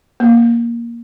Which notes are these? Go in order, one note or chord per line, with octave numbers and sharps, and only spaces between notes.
A#3